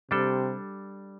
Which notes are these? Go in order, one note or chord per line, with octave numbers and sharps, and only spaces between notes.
C3 G3 D4 A4